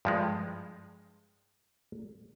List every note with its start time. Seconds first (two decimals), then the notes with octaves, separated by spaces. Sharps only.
0.05 G2 F3 G#3